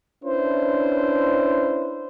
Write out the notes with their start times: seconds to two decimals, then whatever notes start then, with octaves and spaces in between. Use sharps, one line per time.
0.24 C#4 D4 E4 B4 C5